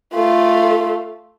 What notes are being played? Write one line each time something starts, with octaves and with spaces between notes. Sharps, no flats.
A3 F4